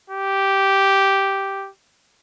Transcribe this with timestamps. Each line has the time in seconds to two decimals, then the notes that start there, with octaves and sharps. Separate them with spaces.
0.10 G4